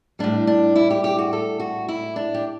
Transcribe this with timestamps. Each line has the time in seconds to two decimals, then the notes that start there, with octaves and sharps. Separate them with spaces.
0.19 A2 G3 D4
0.47 D4
0.76 E4
0.90 G4
1.04 G4
1.18 F#4
1.33 A4
1.60 F#4
1.88 E4
2.16 D4
2.34 G4